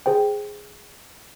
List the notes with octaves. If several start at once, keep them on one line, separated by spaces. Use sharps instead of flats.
G#4 C5 G5